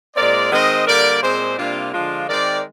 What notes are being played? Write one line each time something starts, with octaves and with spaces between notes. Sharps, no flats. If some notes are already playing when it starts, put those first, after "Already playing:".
A#2 G#3 C4 A#4 D5
D#3 G#3 C4 C5 D#5
D3 G3 A#3 A#4 D5
A#2 G#3 C4 G#4 C5
C3 G3 A#3 D4 F4
D3 F3 G#3 D4 F4
D#3 G#3 C4 A#4 D5